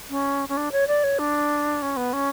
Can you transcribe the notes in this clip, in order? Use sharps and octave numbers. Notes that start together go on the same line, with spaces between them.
C#4
C#4
D4
C#5
D5
C#5
D4
C#4
B3
C#4